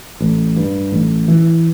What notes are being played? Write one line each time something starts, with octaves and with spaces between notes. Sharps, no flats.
A1
G2
A1
E3